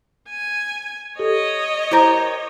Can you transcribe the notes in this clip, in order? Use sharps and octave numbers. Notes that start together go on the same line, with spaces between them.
G#5
G4 A4 C#5 D#5
E4 G4 A#4 C5 G6